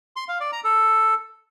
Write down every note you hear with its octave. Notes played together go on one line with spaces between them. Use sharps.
C6
F5
D5
A#5
A4